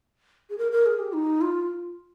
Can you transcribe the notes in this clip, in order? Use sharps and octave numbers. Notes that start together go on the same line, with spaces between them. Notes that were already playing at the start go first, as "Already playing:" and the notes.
G#4
A#4
A#4
G#4
G4
D#4
F4